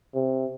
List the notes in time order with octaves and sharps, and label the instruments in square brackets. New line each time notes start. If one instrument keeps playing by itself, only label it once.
[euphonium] C3